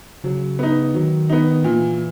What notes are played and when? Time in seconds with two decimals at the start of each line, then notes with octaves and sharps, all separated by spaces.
0.24 C#3 F#3
0.59 B3 D#4
0.94 D#3 F#3
1.29 B3 D#4
1.64 A#2 E3